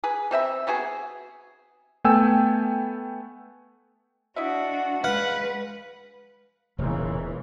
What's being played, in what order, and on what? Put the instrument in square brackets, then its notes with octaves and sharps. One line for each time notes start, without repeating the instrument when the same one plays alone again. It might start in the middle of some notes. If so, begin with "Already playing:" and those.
[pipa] G#4 B4
B2 C4 E5 B5
G3 B3 F#4 G#4
[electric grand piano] A3 B3 A4 G5 G#5 E6
[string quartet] D4 F#4 [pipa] E4 D#5 E5
[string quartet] G#3 [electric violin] B4 [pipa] F5 [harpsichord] F#5
[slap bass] E1 [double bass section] A#2 C#3 E3